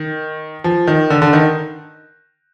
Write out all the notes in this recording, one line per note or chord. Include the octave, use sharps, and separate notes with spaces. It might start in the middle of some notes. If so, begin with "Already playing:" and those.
Already playing: D#3
F3
D#3
D3
D3
D#3